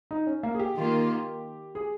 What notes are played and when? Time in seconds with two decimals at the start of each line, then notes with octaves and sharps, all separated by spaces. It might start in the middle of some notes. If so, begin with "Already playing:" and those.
0.11 D#4
0.27 C#4
0.43 A#3
0.55 G#4
0.59 G4
0.76 D#3 A#3 F4
1.75 G#4